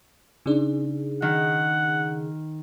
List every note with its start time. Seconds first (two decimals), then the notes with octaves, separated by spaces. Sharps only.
0.46 C#3 D4 D#4 G#4 D5
1.22 D#3 F#5